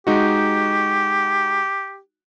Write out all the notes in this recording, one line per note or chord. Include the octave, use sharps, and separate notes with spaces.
G#3 D#4 F#4 G4